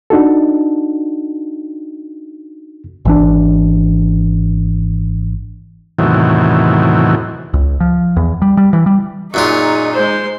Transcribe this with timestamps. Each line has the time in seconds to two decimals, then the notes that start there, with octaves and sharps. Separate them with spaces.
0.10 D4 D#4 F#4 A4
3.05 G#1 E3 D4
5.99 E2 A2 C3 D#3 E3 F#3
7.54 C#2
7.80 F3
8.17 E2
8.42 G3
8.57 G3
8.73 E3
8.86 G3
9.34 F#2 A#2 D#4 F4 G#4 C#6
9.94 G#3 C5 C6